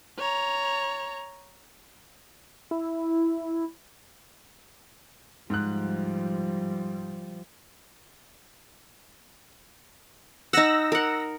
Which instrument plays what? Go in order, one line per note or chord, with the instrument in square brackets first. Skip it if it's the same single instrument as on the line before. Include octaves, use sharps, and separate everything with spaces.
[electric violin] C#5 A#5
[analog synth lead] E4
[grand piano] G#2 F#6 [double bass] F3 G3
[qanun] D#4 F#5 [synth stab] E6 A#6
[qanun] A#4 F#5